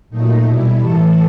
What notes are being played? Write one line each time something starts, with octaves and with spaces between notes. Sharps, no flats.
A#2 F#3 A3 D#4
B2 G3 E4
A2 E3 A3 A4